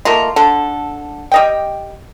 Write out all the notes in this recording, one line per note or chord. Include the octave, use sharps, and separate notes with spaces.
D#3 A3 A#3 F4
D3 A4
G3 D#5 G5